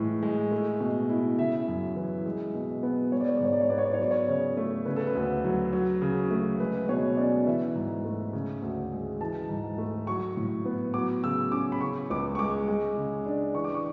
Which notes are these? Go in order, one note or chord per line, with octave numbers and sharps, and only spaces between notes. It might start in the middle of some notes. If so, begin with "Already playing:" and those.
Already playing: A2 E3 G#3
G#3
A3
B2
E4
C#3 E5
F#2
E3
G#3
B2
B3
G#3 C#5
D5
C#5
D5
G#2 C#5
D5
C#5
B3 D5
C#5
D5
C#5
F#3 D5
C#5
C#3
A3
C#3 B4
A4
B4
D2
F#3
F#3
C#3
A3
G#3 B4
B2 C#5
C#4 D5
E3 E5
G#2
A3
C#3
D2
G#3
E3 A5
G#2
A3
F#3 C#6
A2
B3
F#3 D6
C#3 E6
C#4 D6
B5
C#3 C#6
C#2 D6
C#6
G#3 D6
G#3
C#3
D4
E3 C#6
D6
C#6